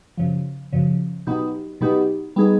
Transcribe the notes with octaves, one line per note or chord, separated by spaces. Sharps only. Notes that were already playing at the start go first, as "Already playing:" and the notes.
F#2 C#3 F3
F#2 C#3 F3
B2 F#3 B3 D#4 G4
B2 F#3 B3 D#4 G4
G3 B3 D#4 G#4